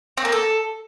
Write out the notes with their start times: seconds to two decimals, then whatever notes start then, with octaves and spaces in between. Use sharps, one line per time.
0.17 C4
0.25 A#3
0.32 A4